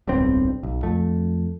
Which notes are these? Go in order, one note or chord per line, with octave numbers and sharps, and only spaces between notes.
D1 B1 G2 C4
B1
F2 A3